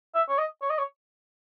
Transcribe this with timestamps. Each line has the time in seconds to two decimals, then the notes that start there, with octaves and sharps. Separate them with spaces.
0.15 E5
0.29 C#5
0.38 D#5
0.62 C#5
0.70 D#5
0.78 C#5